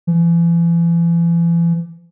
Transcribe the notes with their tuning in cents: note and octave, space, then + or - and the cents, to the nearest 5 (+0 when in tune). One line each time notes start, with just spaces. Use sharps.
E3 +40